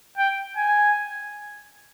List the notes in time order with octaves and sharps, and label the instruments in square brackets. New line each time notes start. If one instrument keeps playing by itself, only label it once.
[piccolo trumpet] G5
G#5